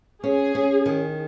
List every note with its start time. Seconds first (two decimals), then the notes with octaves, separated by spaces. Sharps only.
0.24 C#4 G#4
0.55 C#4
0.86 D#3